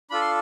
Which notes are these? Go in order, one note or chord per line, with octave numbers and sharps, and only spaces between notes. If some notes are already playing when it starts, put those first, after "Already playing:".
D4 F4 A4 B5
C6